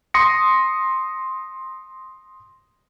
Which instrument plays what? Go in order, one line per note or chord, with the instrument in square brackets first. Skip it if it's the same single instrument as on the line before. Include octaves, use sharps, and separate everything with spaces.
[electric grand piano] C6 D#6 A#6 C#7